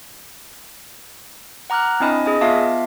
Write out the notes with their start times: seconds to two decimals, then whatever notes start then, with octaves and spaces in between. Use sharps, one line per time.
1.70 F#5 A#5 D6 F6 F#6
2.00 C4 D4 E4 D#5 G#5 B5
2.26 G#4 D#5 G#5
2.41 B3 F4 E5 F5 A5 D6